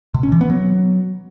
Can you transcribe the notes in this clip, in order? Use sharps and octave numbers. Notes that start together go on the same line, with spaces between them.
B2
C#4
E3
B3
F#3